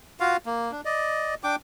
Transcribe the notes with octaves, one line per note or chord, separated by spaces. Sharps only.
F4 F#4 F5
A#3
D4
D5 D#5
D4 G5 D6